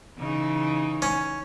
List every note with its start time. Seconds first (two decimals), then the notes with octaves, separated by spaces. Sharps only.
0.18 C#3 E3 D#4
1.02 C#4